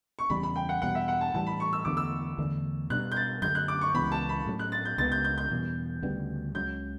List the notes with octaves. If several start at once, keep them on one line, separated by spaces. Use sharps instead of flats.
C#6
E2 C#3 G3 B5
B5
G5
F#5
E2 B2 G3 F#5
E5
F#5
A5
A2 E3 G3 A5
B5
C#6
E6
E2 D3 A3 D6
E6
E2 D3 A3 D4
B2 G3 D4 F#6
G6
A6
F#2 D3 A3 G6
F#6
D6
C#6
C#2 C#3 E3 B3 B5
A5
B5
A2 F#3 A3 C#4
F#6
A6
G6
C#2 C#3 E3 B3 A6
G6
G6
G6
E2 B2 G3
D2 C#3 G3 B3
C#2 C#3 F#3 G6